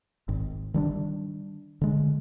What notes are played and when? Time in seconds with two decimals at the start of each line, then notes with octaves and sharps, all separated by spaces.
0.29 G#1 G#2 D#3
0.74 D#3 G3 D4
1.81 D3 G#3